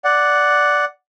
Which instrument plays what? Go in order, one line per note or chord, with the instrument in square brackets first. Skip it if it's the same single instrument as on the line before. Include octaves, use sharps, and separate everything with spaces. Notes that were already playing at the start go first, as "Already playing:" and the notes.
[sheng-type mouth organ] D5 F#5